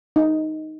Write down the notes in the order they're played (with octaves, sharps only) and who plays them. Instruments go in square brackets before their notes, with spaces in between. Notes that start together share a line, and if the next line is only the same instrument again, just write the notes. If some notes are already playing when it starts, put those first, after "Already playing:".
[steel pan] D#4